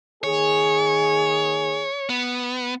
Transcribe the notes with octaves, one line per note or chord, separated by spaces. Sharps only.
D#3 A#3 G#4 C#5
B3